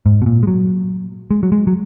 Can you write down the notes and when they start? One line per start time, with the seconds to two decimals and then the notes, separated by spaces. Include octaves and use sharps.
0.06 G#2
0.22 B2
0.26 A#2
0.43 G#3
0.47 F#3
1.31 G#3
1.43 F#3
1.52 G#3
1.67 F#3